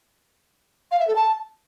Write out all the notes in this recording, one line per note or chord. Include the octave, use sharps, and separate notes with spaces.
F5
E5
A4
A5